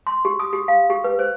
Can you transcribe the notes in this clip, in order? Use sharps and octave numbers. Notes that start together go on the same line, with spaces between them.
C6
G4
D#6
G4
F5
G4
B4
C5